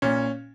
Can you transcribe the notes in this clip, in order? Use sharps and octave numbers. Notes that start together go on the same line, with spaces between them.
A#2 C#4